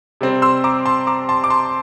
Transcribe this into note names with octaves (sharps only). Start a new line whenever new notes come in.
C3 G3 C4
C6 E6
A#5 D6
A5 C6
A#5 D6
A5 C6
D6
A5 C6